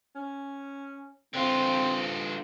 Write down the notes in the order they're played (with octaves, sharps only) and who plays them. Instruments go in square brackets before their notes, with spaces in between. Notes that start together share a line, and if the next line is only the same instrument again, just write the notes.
[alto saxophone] C#4
[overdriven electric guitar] D3 F4 [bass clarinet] C4 [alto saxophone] C5